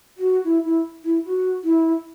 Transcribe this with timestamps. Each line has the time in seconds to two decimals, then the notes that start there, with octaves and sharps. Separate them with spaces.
0.18 F#4
0.44 E4
0.65 E4
1.04 E4
1.25 F#4
1.64 E4